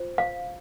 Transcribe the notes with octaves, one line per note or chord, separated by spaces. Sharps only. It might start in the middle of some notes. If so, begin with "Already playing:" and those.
Already playing: F4 C5
F5